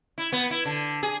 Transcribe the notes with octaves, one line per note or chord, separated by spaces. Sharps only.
E4
B3
E4
D3
G#4